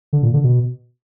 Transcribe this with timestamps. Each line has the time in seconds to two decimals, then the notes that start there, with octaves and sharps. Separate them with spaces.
0.13 D3
0.23 A#2
0.33 D3
0.44 B2